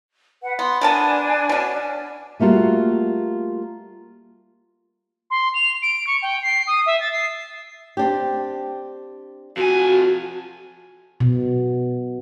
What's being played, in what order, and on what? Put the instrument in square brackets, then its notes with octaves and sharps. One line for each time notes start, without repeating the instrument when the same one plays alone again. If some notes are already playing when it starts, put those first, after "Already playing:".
[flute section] B4 F#5
[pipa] B3 [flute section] C6
[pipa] B3 A#4 A5 [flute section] D4 G#5
[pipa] B2 C#4
[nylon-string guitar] G3 A3 A#3 F4 F#4
[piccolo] C6
F7
D7
C#6
G5
C7
D#6
E5
A6
C7
[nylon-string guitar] C4 D4 G4
[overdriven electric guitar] F2 G#5 [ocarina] F#4
[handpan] B2